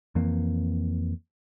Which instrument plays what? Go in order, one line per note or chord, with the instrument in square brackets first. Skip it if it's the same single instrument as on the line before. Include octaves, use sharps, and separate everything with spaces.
[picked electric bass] F2 E3 A#3 C4